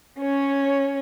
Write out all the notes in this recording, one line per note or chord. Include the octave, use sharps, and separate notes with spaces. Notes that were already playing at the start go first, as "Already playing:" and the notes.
C#4 C#5